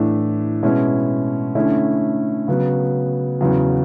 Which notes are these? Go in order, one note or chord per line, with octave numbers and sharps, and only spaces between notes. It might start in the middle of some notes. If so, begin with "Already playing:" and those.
Already playing: A2 E3 A3 D4
B2 G#3 C#4 E4
D3 A3 C#4 E4
C#3 F#3 B3
E2 C#3 F#3